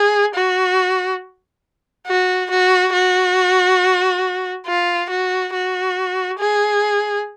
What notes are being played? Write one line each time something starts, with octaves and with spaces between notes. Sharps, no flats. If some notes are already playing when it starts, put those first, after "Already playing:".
Already playing: G#4
F#4
F#4
F#4
F#4
F4
F#4
F#4
G#4